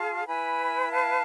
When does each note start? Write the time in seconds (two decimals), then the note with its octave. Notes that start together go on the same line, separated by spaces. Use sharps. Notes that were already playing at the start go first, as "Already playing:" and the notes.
Already playing: F4 G#4 F5 A5
0.26 E4 B4 G#5 B5
0.90 F5 A5